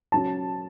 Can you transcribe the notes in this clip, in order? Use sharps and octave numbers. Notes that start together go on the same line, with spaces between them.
F#3 C#4 A5